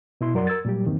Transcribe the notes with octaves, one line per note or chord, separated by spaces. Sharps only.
B2 E4 C6
F#2 F#3 A#4 D5 F#5 C6
A#4 E6 G#6 A6
A#2 F#3 G3 G4
E2 G2 D#3 E3 A#3 C4